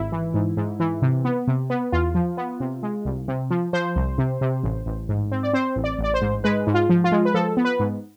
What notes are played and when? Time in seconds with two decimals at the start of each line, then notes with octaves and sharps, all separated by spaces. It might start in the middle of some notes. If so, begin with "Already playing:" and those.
Already playing: G#1 E4
0.12 E3
0.34 G#2
0.57 G#2
0.80 E3
1.02 C3
1.25 B3
1.48 C3
1.70 B3
1.92 E2 F4
2.15 F3
2.37 B3
2.60 C3
2.83 G#3
3.05 C2
3.28 C3
3.50 F3
3.73 F3 C5
3.96 C2
4.18 C3
4.41 C3
4.63 A1
4.86 A1
5.09 G#2
5.32 C4
5.43 D5
5.53 C4 C5
5.76 A1
5.84 D5
5.99 A1 D5
6.14 C5
6.21 G#2
6.44 G#3 B4
6.67 G#2
6.74 F4
6.89 F3
7.04 F4
7.12 G#3
7.25 B4
7.34 F3 A4
7.57 B3
7.65 B4
7.79 G#2